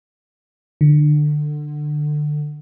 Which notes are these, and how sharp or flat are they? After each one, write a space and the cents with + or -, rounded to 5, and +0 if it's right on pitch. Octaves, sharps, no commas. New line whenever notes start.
D3 +25